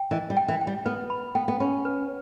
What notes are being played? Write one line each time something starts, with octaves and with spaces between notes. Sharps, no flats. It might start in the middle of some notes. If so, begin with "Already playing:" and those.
Already playing: G5
E3 D#5
G3
G5
E3
G5
G3
B3 B4
B5
B3 G5
B3
C#4 B5
B4